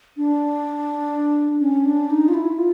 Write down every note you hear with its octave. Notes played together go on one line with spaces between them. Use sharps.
D4
C#4
D4
D#4
F4
E4
F4